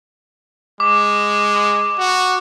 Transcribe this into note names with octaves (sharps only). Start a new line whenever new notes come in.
G#3 D6
F#4